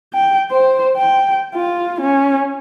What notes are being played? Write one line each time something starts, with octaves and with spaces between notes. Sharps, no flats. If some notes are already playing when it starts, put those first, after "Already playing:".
G5
C5
G5
F4
C#4